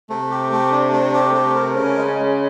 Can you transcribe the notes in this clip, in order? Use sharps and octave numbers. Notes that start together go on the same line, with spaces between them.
C3 A3
G4
A3
D4
A3
G4
A3
A#4
C#3 C#4
G#3
G#3